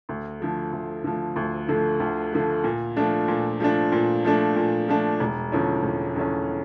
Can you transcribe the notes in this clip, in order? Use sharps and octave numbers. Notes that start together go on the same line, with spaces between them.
D2
D3 F3 A3
D2
D3 F3 A3
D2
D3 F3 A3
D2
D3 F3 A3
A#2
F3 A3 D4
A#2
F3 A3 D4
A#2
F3 A3 D4
A#2
F3 A3 D4
E1
E2 D3 F3 C#4
E1
E2 D3 F3 C#4